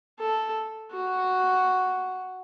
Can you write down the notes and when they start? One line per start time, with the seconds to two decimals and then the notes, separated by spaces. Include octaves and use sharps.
0.19 A4
0.92 F#4